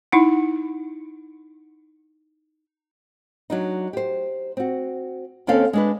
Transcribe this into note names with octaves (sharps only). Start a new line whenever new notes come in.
D#4 E4 F#5
F#3 D4 D#4
G4 C5
C4 F#4
D#2 A#3 C4 C#4 A4 F5
G#3 D4 B4